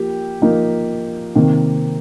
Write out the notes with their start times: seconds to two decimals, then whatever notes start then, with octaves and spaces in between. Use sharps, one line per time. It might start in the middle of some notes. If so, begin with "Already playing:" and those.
Already playing: F3 A#3 G4
0.41 F3 A#3 D#4
1.35 C3 D#3 A#3